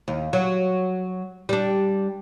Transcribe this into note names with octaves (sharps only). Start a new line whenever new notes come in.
D#2
F#3
G3 D4